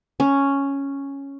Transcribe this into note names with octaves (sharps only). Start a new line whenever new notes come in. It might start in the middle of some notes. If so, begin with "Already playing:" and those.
C#4